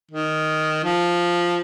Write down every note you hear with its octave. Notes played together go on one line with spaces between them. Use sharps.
D#3
F3